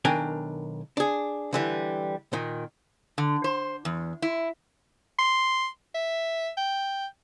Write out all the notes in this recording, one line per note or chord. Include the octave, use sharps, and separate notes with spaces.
B1 D#3 D4 A#4 G5 G#5
D4 G#4
D3 E3 G3
A#2 D#3
D3
C5
E2
E4
C6
E5
G5